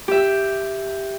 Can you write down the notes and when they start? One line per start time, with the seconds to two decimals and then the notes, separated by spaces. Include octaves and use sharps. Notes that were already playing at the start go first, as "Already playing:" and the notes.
0.08 G4 E5